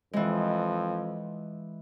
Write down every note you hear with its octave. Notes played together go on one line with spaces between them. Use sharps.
F2 E3 G#3